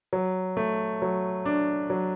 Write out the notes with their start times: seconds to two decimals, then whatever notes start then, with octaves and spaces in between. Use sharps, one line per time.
0.13 F#3
0.57 A3
1.02 F#3
1.46 D4
1.90 F#3